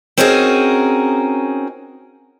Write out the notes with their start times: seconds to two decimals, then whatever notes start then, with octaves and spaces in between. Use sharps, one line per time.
0.18 C4 C#4 D#4 F#4 G#4 A#4